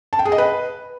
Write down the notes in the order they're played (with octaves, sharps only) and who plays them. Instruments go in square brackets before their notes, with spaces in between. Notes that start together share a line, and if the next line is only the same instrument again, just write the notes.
[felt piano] A5
G5
G#4
D#5
B4